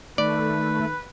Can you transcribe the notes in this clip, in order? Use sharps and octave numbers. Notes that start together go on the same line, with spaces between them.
D#3 A3 B4 D5